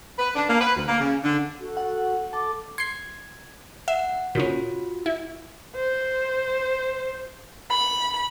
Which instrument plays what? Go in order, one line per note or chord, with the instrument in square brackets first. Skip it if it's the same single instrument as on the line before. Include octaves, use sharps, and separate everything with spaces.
[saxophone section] B4
D4
A#3
B4
D2
A#3
C#3
D3
[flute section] F#4 A4
[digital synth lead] F#5
[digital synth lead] A4 [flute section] D6
[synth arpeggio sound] C6 C7 [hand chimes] G#6
[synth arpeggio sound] E5 [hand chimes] F#5
[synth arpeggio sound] A#2 C#3 C#4 [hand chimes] F4 F#4
[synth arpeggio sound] E4
[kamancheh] C5
B5